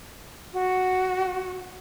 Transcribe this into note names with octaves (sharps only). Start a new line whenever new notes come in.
F#4